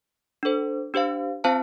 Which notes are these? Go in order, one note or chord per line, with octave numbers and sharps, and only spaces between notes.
D4 A4 C5
D4 G4 C5 F5
C4 F4 C5 F5 A5